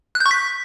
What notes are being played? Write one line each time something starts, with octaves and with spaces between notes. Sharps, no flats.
F#6
G6
C#6
B6